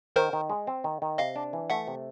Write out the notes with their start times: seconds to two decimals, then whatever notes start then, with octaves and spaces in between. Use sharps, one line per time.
0.16 D#3 A#4 C5
0.33 D#3
0.50 G#3
0.67 C4
0.84 D#3
1.02 D#3
1.18 C3 D#5 F5
1.36 D4
1.53 E3
1.70 A3 E5 F#5
1.88 C3